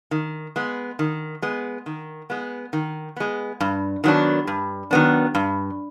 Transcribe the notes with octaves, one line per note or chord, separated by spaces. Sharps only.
D#3
G#3 B3
D#3
G#3 B3
D#3
G#3 B3
D#3
G#3 B3
G2
D#3 F#3 B3 D4
G2
D#3 F#3 B3 D4
G2